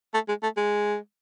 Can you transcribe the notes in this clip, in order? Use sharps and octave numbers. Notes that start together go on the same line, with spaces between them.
A3
G#3
A3
G#3